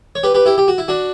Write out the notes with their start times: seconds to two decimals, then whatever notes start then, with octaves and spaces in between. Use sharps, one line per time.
0.15 C#5
0.23 G4 B4
0.34 G4 B4
0.46 E4 G4
0.58 G4
0.68 F#4
0.78 E4
0.88 D4 F#4